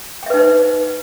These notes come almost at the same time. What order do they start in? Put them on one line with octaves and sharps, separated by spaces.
G5 E5 B4 D#4 C5